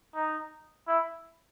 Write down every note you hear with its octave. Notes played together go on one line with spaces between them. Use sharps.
D#4
E4